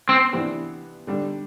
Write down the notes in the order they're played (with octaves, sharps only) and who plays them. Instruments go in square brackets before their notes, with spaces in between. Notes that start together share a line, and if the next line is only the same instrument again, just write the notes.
[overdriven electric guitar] C4
[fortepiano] C3 E3 B3 D4
D3 G3 D4